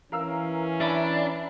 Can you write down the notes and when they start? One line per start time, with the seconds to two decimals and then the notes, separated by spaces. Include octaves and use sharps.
0.12 E3 C#4 A#4 F5 E6
0.81 D4 E5 A#5 B5